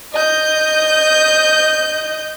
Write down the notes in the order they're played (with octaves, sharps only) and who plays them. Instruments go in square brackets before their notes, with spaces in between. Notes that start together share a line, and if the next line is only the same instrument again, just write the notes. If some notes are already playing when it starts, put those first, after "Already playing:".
[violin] D#5 G6